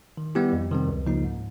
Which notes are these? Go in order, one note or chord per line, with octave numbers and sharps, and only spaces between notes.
D#3
G3 B3 E4 G4
F2
C3 D#3 G3 C4
C#2
C#3 F3 A#3 D#4
G#2